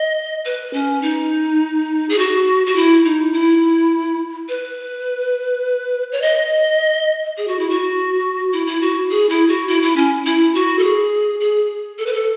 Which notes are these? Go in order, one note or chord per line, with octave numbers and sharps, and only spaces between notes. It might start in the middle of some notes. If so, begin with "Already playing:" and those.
Already playing: D#5
B4
C#4
D#4
G#4
F#4
F#4
E4
D#4
E4
B4
C#5
D#5
G#4
F#4
E4
F#4
E4
E4
F#4
G#4
E4
F#4
E4
E4
C#4
E4
F#4
A4
G#4
G#4
A4
B4
A4